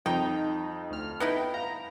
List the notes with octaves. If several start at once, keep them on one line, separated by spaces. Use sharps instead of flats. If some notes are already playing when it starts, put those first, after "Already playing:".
F2 D#4 G5
D2 F6
B3 D#4 E4 G5
F5 A#5 B5